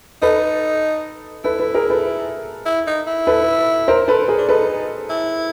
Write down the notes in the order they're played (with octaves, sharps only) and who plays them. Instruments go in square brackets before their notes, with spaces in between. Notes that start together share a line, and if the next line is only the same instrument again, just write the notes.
[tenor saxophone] D#4 [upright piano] A4 B4
[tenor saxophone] E4 [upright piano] A4 B4
[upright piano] A4 B4
G#4 A#4
A4 B4
[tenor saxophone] E4
D#4
E4
[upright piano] A4 B4
A#4 C5
A4 B4
G#4 A#4
[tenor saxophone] D4
[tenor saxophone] D#4 [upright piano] A4 B4
[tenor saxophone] E4